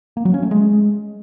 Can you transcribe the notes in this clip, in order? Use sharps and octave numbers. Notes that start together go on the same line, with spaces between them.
A#3
F#3
C#4
A3
G#3